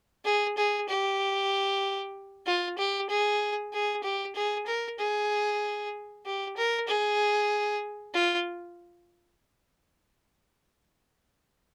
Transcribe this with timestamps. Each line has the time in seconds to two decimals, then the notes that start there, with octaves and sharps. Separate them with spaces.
0.25 G#4
0.57 G#4
0.89 G4
2.46 F4
2.78 G4
3.09 G#4
3.73 G#4
4.03 G4
4.35 G#4
4.67 A#4
4.99 G#4
6.26 G4
6.57 A#4
6.88 G#4
8.14 F4